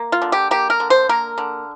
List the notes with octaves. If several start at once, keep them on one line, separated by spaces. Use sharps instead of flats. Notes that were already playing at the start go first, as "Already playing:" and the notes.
Already playing: A#3
F4
D3
G4
A#3 G4
A#4
D3
C5
A#3 A#4
D3